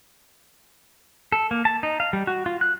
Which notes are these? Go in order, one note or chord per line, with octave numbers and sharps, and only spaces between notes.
A4
A#3
A5
D#4
F5
G3
F#4
F4
F#6